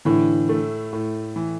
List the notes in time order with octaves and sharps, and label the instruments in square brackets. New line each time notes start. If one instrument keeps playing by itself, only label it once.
[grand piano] A2 [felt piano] D3 E3
[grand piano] A3
A2
E3